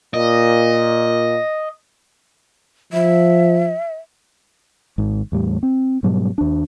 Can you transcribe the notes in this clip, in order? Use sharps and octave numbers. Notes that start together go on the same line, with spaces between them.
A#2 D#5
F3 E5
G#1 G#2
E2 A2 G3
C4
G#2 B2 F#3 G3
D#2 D4